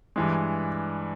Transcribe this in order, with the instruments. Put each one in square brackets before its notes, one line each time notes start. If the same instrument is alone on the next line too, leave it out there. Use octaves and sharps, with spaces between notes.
[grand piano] G2 E3 G#3